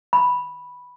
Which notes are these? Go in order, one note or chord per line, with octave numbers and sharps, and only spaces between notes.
B5